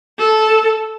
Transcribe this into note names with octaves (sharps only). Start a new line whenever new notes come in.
A4